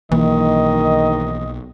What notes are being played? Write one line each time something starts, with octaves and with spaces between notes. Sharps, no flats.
B1 D#3 E3 A#3 D#5